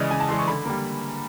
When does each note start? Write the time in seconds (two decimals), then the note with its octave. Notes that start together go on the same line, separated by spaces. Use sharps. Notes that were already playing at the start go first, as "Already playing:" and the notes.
Already playing: C#3 E3 G#3 D5 D#5
0.10 C#3 G#5
0.20 A5
0.28 E3 G#3 C6
0.38 C#6
0.48 D3 B5
0.65 G3 A#3